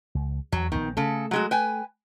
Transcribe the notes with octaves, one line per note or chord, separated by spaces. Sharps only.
C#2
E2 F#3
A#1 D#3 B3
C#3 A3 A4
F#3 G#3 F#4
B4 G5 G#5